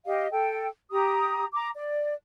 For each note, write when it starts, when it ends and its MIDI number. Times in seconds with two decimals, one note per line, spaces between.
0.05 0.27 67
0.05 0.27 75
0.05 0.27 77
0.31 0.68 69
0.31 0.68 79
0.91 1.45 67
0.91 1.45 82
0.91 1.45 87
1.52 1.69 82
1.52 1.69 86
1.74 2.14 74